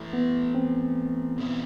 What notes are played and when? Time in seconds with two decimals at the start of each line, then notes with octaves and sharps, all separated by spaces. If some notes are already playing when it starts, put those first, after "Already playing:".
Already playing: E3 A3 E4
0.13 B3
0.54 C4
1.38 E2 B2 G3 B3 E4